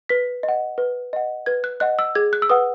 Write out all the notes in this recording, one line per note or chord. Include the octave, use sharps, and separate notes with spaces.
B4 B6
D#5
F#5
B4
D#5 F#5
B4 G#6
F#6
D#5 F#5 F#6
E6
G#4 G#6
F#6
E6
B4 F#5 D#6